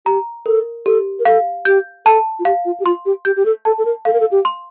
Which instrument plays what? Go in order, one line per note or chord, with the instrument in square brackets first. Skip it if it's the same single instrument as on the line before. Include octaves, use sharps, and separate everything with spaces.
[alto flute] G4 [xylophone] A#5
[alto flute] A4 [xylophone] A#4
[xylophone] G4 [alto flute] A4
[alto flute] A#4
[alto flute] A4 [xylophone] F5
[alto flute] G4 [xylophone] G6
[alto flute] A4 [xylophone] A5
[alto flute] F4
[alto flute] G4 [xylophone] F5
[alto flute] F4
G4
[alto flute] F4 [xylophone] C6
[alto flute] G4
[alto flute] G4 [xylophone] G6
[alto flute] G4
A4
[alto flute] A4 [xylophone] A5
[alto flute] A4
A#4
[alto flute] A4 [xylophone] F5
[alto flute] A#4
A4
G4
[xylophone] C6